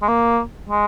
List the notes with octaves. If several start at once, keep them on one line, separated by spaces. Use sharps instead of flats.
G#3
A#3
G#3